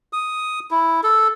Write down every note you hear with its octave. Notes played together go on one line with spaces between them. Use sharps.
D#6
E4
A4